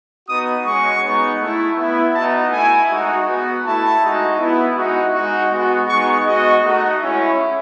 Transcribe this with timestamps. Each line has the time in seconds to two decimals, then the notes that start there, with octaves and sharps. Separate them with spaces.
0.28 B3 D#4 F#4 D#6
0.65 G#3 C#4 F#4 C#6
1.02 G#3 B3 D#4
1.40 A3 E4
1.77 B3 E4
2.15 B3 D#4 F#4 A5
2.52 A3 E4 G#5
2.89 G#3 D#4 F#4
3.27 B3 F#4
3.64 A3 E4 A5
4.02 G#3 D#4 F#4
4.39 B3 E4
4.76 G#3 D#4 F#4
5.13 G#3 D#4 F#4
5.51 G#3 B3 F#4
5.88 G#3 B3 D#4 C#6
6.25 G#3 B3 F#4 D#5
6.63 A3 D#4 F#4
7.00 G#3 C#4 E4